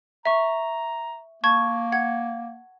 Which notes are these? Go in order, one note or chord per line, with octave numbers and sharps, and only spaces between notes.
E5 A#5 C#6
A#3 A5 C#6 G#6
F#5 G#6